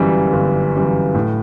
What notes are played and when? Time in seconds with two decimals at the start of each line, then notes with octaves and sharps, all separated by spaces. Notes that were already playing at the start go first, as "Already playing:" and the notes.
Already playing: G1 F#2 E3 G3
0.33 G1
0.74 F#2 E3 G3
1.15 A2